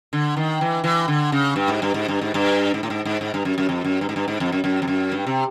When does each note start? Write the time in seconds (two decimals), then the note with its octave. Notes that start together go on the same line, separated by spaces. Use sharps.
0.13 D3
0.37 D#3
0.61 E3
0.84 E3
1.08 D3
1.32 C#3
1.56 G2
1.68 G#2
1.82 G2
1.94 G#2
2.08 G2
2.21 G#2
2.34 G2
2.74 G#2
2.83 A2
2.90 G#2
3.05 G#2
3.21 G#2
3.34 G2
3.45 F#2
3.58 F#2
3.69 F2
3.85 F#2
4.01 G2
4.09 G#2
4.16 G2
4.28 G#2
4.40 F2
4.52 F#2
4.64 F#2
4.82 F2
4.88 F#2
5.12 G2
5.27 C3